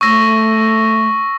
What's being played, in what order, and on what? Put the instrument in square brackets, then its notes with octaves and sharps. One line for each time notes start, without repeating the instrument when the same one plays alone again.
[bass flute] A3 [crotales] C#6 E6 A#6